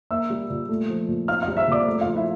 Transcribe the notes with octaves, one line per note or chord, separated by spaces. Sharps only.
A#3 E5 E6
G3
A#2
A3
F3
A#2
C4 F5 F6
F5 F6
G3
E5 E6
A#2 D5 D6
A3
F4 F5
F3
E4 E5